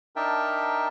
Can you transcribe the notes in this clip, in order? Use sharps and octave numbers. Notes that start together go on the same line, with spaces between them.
D4 D#4 A#4 E5 G5 A5